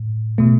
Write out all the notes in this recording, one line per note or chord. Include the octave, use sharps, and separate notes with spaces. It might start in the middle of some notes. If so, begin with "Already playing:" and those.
Already playing: A2
B2 A3